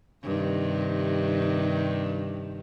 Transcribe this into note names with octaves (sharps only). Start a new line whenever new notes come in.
G2 C3 D#3